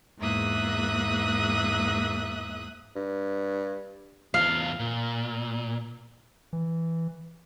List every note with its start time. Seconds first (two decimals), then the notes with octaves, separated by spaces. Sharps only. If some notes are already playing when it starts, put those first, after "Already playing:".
0.19 E2 G#2 A#3 E5 D#6 F#6
2.96 G2
4.34 E2 F4 F5
4.79 A#2
6.53 E3